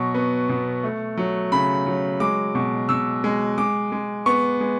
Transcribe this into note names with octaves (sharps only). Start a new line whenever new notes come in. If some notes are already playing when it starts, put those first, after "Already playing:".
Already playing: B2 F#3 C#6
B3
B2
A3
F#3
C#3 B5
F#3
G#3 D6
B2
B2 E6
G#3
G#3 D6
G#3
B3 C#6
G#3